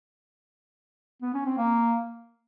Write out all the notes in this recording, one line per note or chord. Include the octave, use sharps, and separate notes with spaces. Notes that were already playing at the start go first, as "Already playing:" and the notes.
B3
C#4
C4
A#3